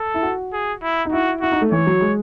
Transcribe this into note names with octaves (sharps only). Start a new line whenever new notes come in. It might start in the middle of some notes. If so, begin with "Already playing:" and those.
Already playing: A4
E4
F#4
G#4
E4
D#4
E4 F#4
E4 F#4
D#4
A3
E3 C#5
F#3
G#3